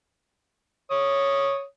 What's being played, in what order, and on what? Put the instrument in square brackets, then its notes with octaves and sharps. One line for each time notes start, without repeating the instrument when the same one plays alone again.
[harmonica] C#5 D#6